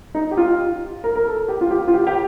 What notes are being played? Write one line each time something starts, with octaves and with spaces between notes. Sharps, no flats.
D#4
G4
F4
A#4
A#4
A4
G4
F4
G4
F4
G4
G4